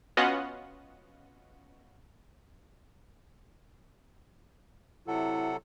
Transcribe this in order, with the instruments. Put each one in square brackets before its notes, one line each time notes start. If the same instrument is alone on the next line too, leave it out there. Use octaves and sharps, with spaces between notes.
[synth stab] B3 C#4 F4 F#4 D#5 F#5
[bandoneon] C3 F#3 A4 [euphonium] E4 [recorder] F#5